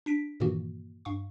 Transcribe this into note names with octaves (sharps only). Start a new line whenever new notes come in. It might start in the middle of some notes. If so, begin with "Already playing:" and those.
D4 B6 D7
G2 A#2 D#3 E3 A#3 F#4
G2 F5 C#6